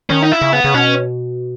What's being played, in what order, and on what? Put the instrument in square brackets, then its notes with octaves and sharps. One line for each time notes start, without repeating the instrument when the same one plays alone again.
[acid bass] D#3 [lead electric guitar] C#4
[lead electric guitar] D#4
E4
[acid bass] C#3
[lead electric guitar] B3
[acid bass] C#3
[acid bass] B2 [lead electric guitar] C#4